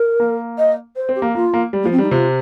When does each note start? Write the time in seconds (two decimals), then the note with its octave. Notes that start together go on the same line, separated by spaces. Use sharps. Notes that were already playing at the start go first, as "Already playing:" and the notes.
Already playing: A#4
0.20 A#3
0.58 D#5
0.96 C5
1.09 C4
1.16 G4
1.22 A#3
1.35 A#3 F4
1.54 A#3
1.73 G3
1.83 A#3
1.86 F3
1.92 C4
1.98 G3 D#4
2.11 C3 F4